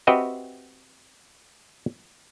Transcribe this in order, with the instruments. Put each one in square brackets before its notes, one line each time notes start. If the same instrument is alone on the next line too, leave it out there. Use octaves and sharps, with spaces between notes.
[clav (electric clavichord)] C4 F#4 G4 B4 D#5 E5